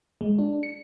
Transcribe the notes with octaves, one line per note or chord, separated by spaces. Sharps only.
G#3
D4
C#7